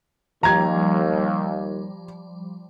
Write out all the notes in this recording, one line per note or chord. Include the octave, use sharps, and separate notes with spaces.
D#2 F3 G3 A#5 G#6